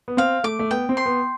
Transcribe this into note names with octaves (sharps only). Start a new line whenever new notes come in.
B3
C4 F5
A3 D6
A3
B3 G5
C4
C6
B3